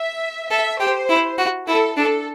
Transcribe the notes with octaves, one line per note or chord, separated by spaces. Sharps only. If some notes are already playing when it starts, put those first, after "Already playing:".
Already playing: E5
A4 E5
G4 C5
E4
F#4
E4 A4
D4 A4